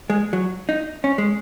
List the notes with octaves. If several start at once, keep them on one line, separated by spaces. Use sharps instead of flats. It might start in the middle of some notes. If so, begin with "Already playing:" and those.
G#3
F#3
D#4
C#4
G#3